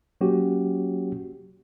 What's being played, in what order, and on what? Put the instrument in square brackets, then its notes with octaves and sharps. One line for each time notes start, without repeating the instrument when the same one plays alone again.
[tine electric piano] F#3 A#3 C#4 F#4 G4